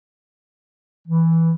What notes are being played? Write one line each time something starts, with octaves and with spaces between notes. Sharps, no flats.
E3